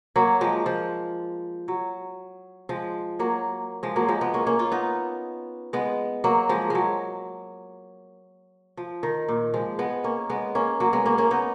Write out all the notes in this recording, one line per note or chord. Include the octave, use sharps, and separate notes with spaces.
F#3 A#3
F3 G#3
F3
F#3
F3 G#3
F#3 A#3
F3 G#3
F#3 A#3
F3 G#3
G#3 B3
A#3 C#4
A#3 C#4
C#4 F4
B3 D#4
G#3 B3
F#3 A#3
F3 G#3
F#3 G#3
F3
D#3
A#2
F3 G#3
G#3 B3
A#3 C#4
G#3 B3
A#3 C#4
F#3 A#3
G#3 B3
A#3 C#4
A#3 C#4
B3 D#4